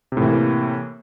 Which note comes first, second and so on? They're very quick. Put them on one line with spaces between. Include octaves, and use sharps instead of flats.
C3 A2 E3 A#3